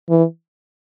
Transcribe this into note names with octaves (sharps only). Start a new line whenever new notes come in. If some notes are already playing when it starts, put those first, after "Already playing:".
E3